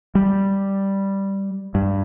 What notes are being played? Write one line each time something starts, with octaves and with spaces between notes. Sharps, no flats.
G3
G2